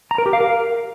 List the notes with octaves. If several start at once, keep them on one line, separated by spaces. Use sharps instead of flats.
A#5
A#4
G4
F5
A#4